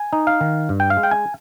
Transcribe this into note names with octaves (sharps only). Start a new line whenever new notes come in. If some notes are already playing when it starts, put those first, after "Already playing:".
Already playing: G#5
D#4
F5
D#3
G2
G5
F5
G#3
G5
G#5